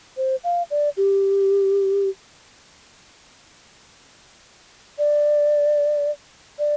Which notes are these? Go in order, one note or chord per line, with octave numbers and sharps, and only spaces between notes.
C5
F5
D5
G4
D5
D5